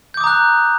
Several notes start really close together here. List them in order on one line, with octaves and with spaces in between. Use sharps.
G6 D6 D#6 A#5 F#6